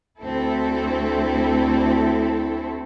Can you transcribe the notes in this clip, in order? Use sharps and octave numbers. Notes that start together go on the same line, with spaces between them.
D2 C4 E4 A4